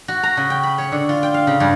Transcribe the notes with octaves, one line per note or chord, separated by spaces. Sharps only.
F#4
A#5
C#3
G5
B5
C#5
D3
F4
G5
F5
C#3
G2